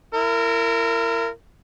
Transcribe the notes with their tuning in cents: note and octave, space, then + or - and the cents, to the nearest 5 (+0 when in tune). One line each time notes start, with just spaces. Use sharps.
E4 +30 A#4 -20